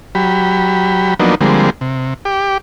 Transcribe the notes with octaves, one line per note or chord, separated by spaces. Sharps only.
F#3 G4 B5
F3 F#3 A#3 B3 D4 D#4
D3 F3 G3 G#3 A#3 C4
C3
G4 D6